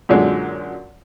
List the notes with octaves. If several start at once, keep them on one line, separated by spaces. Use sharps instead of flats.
F#2 A#2 D3 F#3 G#3